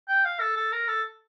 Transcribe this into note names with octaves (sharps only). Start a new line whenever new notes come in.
G5
F5
A4
A4
A#4
A4